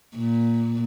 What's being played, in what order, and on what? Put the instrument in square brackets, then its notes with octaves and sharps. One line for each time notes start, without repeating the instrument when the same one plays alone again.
[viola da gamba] A#2